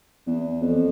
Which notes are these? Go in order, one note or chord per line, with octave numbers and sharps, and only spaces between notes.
E2
F2